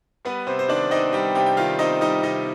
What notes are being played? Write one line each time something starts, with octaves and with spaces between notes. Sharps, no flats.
G3 B3 B4
C3 C4 C5
C5
D#3 D4 D5
C4 D#4 D#5
G3 G4 G5
C3 G4 G5
G5
D#3 F4 F5
C4 D#4 D#5
G3 D#4 D#5
C3 D#4 D#5